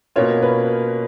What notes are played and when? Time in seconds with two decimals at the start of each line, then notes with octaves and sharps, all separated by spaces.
0.16 B2 A#3 C#4 F4 C#5
0.42 B4